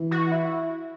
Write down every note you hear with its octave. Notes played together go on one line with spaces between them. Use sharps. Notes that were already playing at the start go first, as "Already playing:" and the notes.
Already playing: E3
F#4
E4